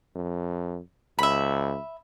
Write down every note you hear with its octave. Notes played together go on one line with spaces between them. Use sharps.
F2
C#2 E5 B5